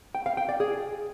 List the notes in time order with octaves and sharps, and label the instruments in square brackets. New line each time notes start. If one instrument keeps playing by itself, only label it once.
[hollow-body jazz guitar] G5
F5
G5
D5
G#4